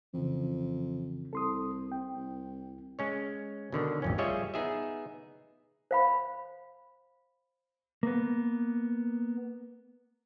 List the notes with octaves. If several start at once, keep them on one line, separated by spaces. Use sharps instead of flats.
F2 C#3 E3
C2 A4 C6 D#6
C4 G5
C2
G#3 C#4 C#5
B2 D3 D#3
A1 F2 C#4
G3 F4 G#4 C#5 D#5 E5
B3 D#4 G#4 E5
C5 F5 B5
A#3 B3